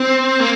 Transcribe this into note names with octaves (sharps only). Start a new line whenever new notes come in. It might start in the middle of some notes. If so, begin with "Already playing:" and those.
Already playing: C4
A#3